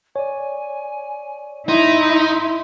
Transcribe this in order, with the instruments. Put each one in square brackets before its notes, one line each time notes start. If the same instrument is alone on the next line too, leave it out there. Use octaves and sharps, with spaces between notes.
[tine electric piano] C#5 D5 [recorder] G#5
[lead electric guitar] D#4 [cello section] E4 [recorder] C6